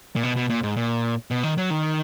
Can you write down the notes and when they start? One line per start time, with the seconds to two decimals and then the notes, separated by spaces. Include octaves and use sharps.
0.16 A#2
0.23 B2
0.36 B2
0.50 A#2
0.63 G#2
0.77 A#2
1.31 B2
1.43 D#3
1.58 F#3
1.70 D#3